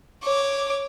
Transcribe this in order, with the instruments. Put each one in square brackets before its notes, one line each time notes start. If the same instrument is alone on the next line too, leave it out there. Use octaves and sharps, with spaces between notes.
[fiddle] C#5 D6